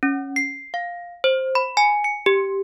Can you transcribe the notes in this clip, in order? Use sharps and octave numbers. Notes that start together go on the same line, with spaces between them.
C#4
C7
F5
C5
B5
G#5
C#7
G4